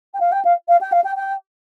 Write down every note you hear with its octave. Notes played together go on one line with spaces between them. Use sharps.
G5
F5
G5
F5
F5
G5
F5
G5
G5